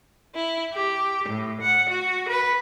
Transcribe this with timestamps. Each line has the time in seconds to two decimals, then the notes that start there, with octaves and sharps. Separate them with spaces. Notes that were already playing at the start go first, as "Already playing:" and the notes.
0.35 E4
0.74 G4
1.29 A2
1.59 F#5
1.90 F#4
2.29 B4